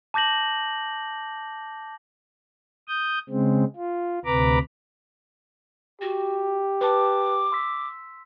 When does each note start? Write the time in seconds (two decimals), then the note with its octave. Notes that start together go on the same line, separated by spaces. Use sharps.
0.14 A5 D6 G6 A#6 F#7
2.88 D#6 G6
3.30 C#3 G#3 C4
3.76 F4
4.25 D2 C3 B4 A#5 B5 D6
6.01 F#4 G4
6.81 B4 A5 D6
7.52 C6 E6 B6